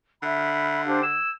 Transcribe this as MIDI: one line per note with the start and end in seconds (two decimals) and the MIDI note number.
0.23 1.20 50
0.23 0.81 76
0.23 0.81 83
0.85 1.03 62
0.85 1.02 67
0.85 1.02 72
0.85 1.02 77
1.03 1.31 88
1.03 1.30 92